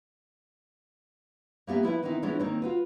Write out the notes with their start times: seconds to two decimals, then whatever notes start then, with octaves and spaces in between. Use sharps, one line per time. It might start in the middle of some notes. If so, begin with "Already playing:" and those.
1.67 A#3 B3 G4 E5 G#5
1.83 F3 E4 B4 E5
2.03 D#3 E3 B3 C4 D#4 E4
2.23 E3 F3 G#3 B3 C#4 D4
2.39 D#3 A#3 C4 C#4 D#4
2.62 F4 F#4 B4